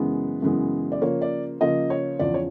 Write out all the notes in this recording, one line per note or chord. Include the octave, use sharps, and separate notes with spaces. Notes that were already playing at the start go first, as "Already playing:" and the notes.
Already playing: F#2 C#3 E3 G#3 B3
F#2 C#3 E3 G#3 B3
D5
C#3 F3 A#3 C#5
D5
C#3 F3 A#3 D#5
C#5
E2 C#3 F3 D5
C#5